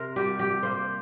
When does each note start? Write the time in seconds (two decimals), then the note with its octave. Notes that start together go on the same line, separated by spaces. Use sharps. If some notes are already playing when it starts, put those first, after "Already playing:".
Already playing: C3 A#4 C5
0.16 G3 G4
0.39 G4
0.63 A#3 C5